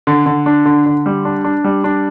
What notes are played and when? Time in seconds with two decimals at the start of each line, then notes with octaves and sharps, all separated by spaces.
0.07 D3
0.26 D3
0.46 D4
0.65 D3
0.86 D3
1.06 G3
1.25 D4
1.44 D4
1.64 G3
1.84 D4